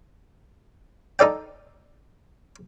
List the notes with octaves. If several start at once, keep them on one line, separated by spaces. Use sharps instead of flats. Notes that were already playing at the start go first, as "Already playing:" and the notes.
D#4 A4 D5 G5